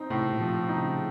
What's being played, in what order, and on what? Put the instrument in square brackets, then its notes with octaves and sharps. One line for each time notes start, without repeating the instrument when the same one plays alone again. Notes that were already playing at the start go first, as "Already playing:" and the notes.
Already playing: [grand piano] C4 D#4
[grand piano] A2 [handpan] C3
[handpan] C3
A#2
[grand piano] F3
[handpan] C3
[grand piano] D#4
[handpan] C#3